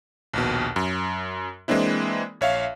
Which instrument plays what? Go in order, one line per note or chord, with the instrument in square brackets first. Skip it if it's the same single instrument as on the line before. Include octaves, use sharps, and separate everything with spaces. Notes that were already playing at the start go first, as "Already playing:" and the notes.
[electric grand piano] A#1 D#2 B2
F#2
E3 G#3 A#3 C4 D4 E4
A#1 C#5 E5 F5